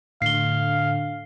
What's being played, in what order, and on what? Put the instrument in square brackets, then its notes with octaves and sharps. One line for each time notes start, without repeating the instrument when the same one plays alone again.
[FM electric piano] A2 [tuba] D3 [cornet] F5 [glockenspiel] C7 G7